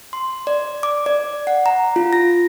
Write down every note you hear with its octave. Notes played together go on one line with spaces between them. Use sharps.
C6
D5
D6
D5
F#5
A#5
F4
A#6